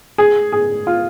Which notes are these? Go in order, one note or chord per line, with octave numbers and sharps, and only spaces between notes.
G#4
G#4
F4